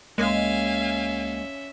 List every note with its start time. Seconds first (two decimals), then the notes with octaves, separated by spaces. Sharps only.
0.18 C#2 G#3 A#3 C#4 E5 F5 G#5